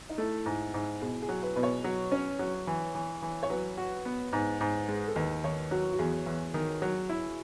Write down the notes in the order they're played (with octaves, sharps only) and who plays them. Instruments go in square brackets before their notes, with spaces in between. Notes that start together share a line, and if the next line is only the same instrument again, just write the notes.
[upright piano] D#4
[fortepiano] A3 [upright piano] E4
[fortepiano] G#2
G#2
[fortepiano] B2 [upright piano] G#4
[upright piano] G#4
[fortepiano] F#3
[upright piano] B4
[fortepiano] B2 [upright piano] B4
[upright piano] C#5
[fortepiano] F#3
C#4
F#3
E3
E3
E3
[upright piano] C#5
[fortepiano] F#3 [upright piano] B4
[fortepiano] F#4
B3
G#2
G#2
G#3
[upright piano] A4
[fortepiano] D#2 [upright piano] B4
[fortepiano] D#3 [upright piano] C#5
[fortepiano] F#3 [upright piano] F#4
[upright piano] F#4
[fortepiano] E2 [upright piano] G#4
[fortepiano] E2
D#3
F#3
E4